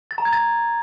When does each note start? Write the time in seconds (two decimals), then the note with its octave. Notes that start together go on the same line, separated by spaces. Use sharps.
0.11 A6
0.18 A#5
0.25 G#6
0.33 A6